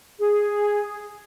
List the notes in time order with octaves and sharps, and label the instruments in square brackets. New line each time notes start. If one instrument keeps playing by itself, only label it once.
[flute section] G#4